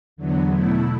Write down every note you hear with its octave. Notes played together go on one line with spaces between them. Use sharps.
E2 D3 F#3 B3
B2 A3 E4